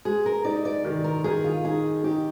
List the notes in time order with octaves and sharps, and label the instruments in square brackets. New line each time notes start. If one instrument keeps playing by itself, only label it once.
[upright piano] G#3 [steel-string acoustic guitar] G#4
[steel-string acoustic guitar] A#4
[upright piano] D#4 [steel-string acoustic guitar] D5
[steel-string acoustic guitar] D5
[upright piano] D#3
[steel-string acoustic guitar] A#4
[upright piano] D#3 [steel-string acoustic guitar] G#4
[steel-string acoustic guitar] F4
[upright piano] D#4 [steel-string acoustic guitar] G#4
[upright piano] D#4 [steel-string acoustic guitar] G4